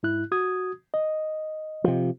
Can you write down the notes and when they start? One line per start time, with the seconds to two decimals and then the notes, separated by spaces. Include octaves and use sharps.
0.03 G#2 E4 F#6
0.32 F#4 D#6 G#6
0.94 D#5
1.84 C3 F3